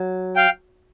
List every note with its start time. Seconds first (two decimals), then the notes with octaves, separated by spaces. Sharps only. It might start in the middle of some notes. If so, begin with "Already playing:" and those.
Already playing: F#3
0.36 F5 G5